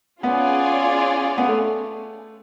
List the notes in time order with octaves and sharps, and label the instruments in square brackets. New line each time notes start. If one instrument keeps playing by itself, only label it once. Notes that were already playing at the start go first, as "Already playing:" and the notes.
[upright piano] B3 [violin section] C#4 F4 G#4 D5
[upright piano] B3
A3